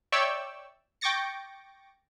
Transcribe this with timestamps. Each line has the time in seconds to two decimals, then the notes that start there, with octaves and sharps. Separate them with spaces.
0.12 C#5 D5 E5 G5 C#6 E6
1.01 G5 C#6 D6 A6 A#6 C#7